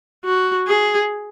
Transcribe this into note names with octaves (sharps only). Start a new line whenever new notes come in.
F#4
G#4